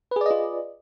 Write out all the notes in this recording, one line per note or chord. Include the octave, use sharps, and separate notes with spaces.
F4 G#4 B4 D5 D#5